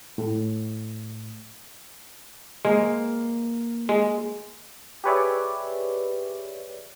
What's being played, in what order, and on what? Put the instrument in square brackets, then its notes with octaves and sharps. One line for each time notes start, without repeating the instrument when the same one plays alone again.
[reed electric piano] A2
[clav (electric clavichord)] G#3 [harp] A#3
[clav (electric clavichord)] G#3
[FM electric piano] G4 G#4 B4 C#5 D5 E5